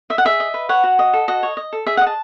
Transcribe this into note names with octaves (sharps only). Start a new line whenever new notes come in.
D#5 E5
F#5
G#4 E5
D#5
B4
C#5 F#5
F#4
D#5
A4
F#4 D#5
C#5
D#5
A4
G#4 E5
F#5
D#5
A5